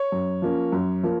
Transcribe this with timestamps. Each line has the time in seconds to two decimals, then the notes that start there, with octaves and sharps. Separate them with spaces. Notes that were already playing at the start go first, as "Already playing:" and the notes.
Already playing: C#5
0.12 F#2
0.42 F3 A#3 C#4
0.72 F#2
1.03 F3 A#3